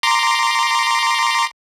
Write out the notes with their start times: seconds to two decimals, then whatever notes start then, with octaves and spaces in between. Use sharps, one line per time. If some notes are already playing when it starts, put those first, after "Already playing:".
0.03 A#5 C6 D6